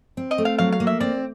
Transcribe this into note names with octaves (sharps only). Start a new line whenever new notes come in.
C4
D#5
A3
F5
F#3 F5
F5
A#3
E5
C4 D5